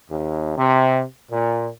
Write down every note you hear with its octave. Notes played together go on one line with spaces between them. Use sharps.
D#2
C3
A#2